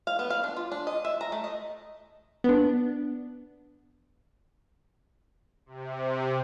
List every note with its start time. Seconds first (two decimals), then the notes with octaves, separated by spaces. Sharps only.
0.07 F5
0.19 B3
0.30 F5
0.44 D4
0.57 F4
0.72 D4
0.87 D#5
1.05 E5
1.21 A#5
1.32 A3
1.44 D#5
2.44 B3 D4
5.66 C3